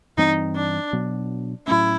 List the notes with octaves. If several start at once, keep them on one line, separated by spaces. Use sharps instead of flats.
G2 E3 G3 C4 D#4
D4
B2 F#3 B3 D4
A2 F#3 A3 C#4 E4